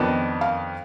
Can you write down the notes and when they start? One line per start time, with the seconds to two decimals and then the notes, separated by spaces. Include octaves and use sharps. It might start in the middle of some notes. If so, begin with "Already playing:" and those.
Already playing: F2 D#3 B3 D4
0.41 F5